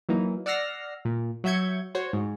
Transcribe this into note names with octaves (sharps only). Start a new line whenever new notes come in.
E3 F#3 A#3 D#4
D5 F#5 E6 F6 A#6 C7
A#2
F#3 F#4 E5 G6 G#6 C#7
F#4 C5 C#5
G#2